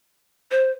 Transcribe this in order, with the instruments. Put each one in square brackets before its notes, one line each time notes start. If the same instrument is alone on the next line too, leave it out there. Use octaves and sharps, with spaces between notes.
[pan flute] C5